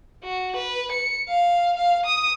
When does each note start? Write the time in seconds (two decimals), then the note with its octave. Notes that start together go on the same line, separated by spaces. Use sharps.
0.24 F#4
0.56 B4
0.91 C#7
1.29 F5
1.77 F5
2.05 D#6